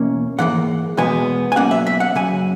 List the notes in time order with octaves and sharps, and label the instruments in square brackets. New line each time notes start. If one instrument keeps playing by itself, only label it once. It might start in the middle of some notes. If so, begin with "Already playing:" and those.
Already playing: [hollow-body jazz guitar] E2 B2 A#3 C#4
G#2 E3 A#3 F#5
E2 B2 G#3 B3 G#5
G#5
B1 B2 A#3 C#4 F#5
E5
E5
F#5
F#2 C#3 G#5